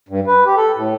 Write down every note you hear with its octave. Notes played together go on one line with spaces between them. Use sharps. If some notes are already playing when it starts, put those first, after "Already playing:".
G2
B4
G4
A4
A2